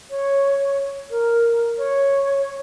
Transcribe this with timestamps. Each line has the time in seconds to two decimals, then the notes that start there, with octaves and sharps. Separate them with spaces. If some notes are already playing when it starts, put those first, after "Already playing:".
0.10 C#5
1.10 A#4
1.78 C#5